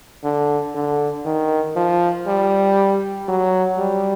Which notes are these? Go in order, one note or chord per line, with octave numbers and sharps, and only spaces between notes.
D3
D3
D#3
F3
G3
F#3
G3